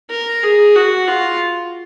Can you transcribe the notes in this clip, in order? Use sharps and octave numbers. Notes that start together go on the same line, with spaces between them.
A#4
G#4
F#4
F4